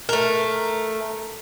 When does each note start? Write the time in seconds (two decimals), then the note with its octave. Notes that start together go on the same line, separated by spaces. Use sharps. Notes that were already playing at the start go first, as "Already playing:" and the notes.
0.09 A3 A#4